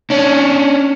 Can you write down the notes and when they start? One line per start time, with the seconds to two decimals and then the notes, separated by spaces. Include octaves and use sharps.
0.10 C#4 D4